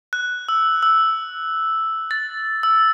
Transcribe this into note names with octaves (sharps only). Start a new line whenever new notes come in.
F#6
E6
E6
A6
E6